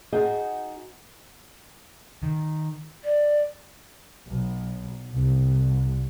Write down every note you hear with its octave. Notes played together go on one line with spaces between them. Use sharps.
D#4 F#4 G#4 D#5 G5
D#3
D5
B1
C2